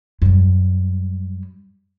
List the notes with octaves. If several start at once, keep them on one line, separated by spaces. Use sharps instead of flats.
F#2 G3